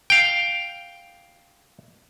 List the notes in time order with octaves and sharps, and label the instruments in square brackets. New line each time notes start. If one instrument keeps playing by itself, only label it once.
[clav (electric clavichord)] F5 G5